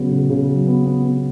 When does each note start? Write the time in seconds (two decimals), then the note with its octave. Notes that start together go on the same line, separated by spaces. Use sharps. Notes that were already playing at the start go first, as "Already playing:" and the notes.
Already playing: C#3 F#3 B3
0.10 C#3
0.30 C#3
0.49 F#3
0.67 B3
0.86 B3
1.04 B3